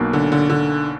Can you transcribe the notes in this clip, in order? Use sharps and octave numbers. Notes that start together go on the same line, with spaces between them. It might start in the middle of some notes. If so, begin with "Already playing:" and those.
Already playing: B1 B2 A#3
D3
D3
D3